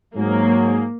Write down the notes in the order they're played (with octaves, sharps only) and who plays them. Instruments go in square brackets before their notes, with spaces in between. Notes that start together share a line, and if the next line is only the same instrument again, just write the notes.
[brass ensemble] G#2 F#3 G#4 [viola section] A#3